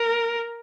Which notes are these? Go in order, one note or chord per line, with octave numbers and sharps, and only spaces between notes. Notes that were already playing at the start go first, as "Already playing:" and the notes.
Already playing: A#4